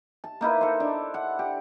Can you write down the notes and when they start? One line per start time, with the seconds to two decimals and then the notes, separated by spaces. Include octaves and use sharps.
0.24 A5
0.41 A#3 D#4 E4 B4
0.61 A4 C5
0.80 D4
1.14 F#5
1.39 G4